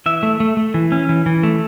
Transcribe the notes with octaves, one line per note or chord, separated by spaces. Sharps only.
E3 E5
A3
A3
A3
E3
C#4
E3
E3
A3